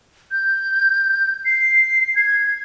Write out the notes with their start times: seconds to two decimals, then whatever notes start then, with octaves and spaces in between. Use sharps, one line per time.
0.31 G6
1.46 C7
2.15 G#6